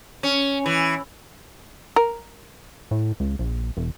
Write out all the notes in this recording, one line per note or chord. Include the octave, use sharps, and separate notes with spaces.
C#4
E3
A#4
A2
C#2
A#1
E1